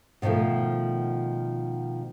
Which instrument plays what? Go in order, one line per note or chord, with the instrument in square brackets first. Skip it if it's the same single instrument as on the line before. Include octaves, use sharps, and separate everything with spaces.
[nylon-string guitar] B2 D3 D#3 F3 A3